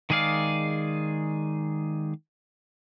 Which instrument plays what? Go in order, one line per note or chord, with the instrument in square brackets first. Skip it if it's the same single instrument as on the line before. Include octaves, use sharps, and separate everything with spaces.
[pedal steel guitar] D#3 G#3 G#4 D5 F5